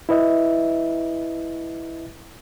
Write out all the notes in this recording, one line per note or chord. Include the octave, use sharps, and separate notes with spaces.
E4 B4 D#5 E5